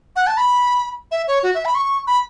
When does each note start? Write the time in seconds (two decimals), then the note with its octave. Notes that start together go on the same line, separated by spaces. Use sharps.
0.16 F#5
0.27 A5
0.37 B5
1.11 E5
1.28 C#5
1.43 F#4
1.54 E5
1.65 B5
1.75 C#6
2.07 B5